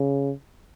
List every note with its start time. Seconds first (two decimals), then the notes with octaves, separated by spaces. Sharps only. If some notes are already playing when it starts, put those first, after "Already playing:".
Already playing: C#3